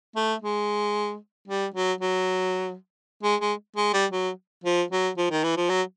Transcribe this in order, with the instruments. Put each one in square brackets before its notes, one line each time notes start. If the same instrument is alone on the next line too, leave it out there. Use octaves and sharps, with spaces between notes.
[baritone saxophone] A3
G#3
G3
F#3
F#3
G#3
G#3
G#3
G3
F#3
F3
F#3
F3
D#3
E3
F3
F#3